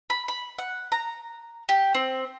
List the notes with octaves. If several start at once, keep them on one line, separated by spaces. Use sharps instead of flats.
B5
B5
F#5
A#5
G4
C4